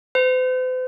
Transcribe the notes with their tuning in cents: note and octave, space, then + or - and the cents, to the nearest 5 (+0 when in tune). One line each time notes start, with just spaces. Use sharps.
C5 -45